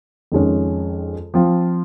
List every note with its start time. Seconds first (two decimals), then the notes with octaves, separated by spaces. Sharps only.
0.32 F2 D#3 G#3 C#4
1.34 F3 C4 F4